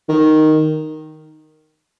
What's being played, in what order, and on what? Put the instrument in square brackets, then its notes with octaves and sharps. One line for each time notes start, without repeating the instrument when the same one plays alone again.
[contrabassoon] D#3